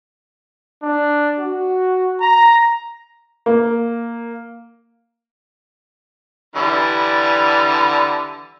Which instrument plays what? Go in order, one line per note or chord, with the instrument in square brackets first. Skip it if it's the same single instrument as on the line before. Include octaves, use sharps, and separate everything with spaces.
[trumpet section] D4
F#4
A#5
[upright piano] A#3
[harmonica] D3 E3 G3